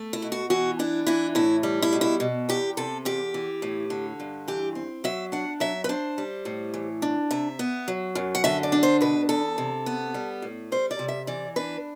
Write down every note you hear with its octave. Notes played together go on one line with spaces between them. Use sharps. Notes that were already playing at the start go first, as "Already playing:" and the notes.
Already playing: A3
E4
B2
F#4
E3 F#4
D4 E4
E3 E4
A2 E4
G3
E4
B2
E4
B2
E2 G4
C3 A4
E2 G4
E3
A2
D3
G2
E3 G4
C4
F#3 E5
D4 F#5
F#3 E5
B4
D4 C5
G3
A2
E3
D4
C3 E5
B3
F#3
F#2
F#5
D3 E5
D5
D4
C5
B2 B4
E2 A4
C3
B3
G3
A2
G3 C5
D5
C3
E5
E3 D5
D4 B4